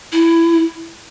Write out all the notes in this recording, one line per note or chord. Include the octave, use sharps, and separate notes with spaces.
E4